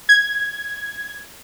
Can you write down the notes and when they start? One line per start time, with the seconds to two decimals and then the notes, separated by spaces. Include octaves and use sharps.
0.09 G#6